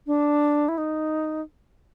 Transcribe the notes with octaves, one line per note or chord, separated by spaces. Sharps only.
D4
E4
D#4